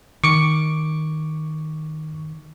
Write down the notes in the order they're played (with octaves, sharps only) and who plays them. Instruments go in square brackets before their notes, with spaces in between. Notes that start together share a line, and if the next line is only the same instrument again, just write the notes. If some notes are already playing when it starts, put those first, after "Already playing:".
[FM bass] D#3 [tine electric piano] C#6 D6 C#7